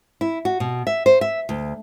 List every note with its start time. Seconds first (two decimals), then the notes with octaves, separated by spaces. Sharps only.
0.21 E4
0.45 F#4
0.60 B2
0.87 E5
1.06 C5
1.21 E5
1.49 D2